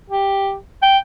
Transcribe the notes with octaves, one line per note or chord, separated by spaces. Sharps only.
G4
G5